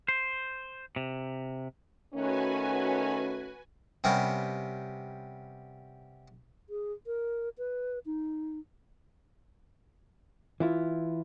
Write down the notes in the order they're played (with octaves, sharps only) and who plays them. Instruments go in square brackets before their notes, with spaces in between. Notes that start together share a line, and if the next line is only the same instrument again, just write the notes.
[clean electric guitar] C5
C3
[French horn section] D#3 A3 C#4 [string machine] F#4 B4 G#5
[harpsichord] C3 G3 B3 C#4 A#4
[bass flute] G#4
A#4
B4
D#4
[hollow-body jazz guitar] E3 E4 F4